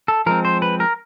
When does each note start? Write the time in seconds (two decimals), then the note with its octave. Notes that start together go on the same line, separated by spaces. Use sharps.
0.08 A4
0.26 F3 G#3 C4 A#4
0.45 C5
0.62 B4
0.80 A#4